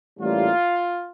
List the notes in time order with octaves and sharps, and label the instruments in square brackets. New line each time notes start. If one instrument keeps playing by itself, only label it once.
[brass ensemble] A1 A2 G3 A#3 F4